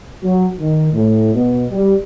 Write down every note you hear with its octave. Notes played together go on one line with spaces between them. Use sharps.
F#3
D#3
A2
B2
G3